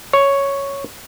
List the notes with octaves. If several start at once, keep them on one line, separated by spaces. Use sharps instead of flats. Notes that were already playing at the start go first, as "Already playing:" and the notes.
C#5